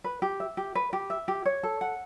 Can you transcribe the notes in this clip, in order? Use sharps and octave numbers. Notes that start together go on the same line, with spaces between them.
B4
G4
E5
G4
B4
G4
E5
G4
C#5
A4
F#5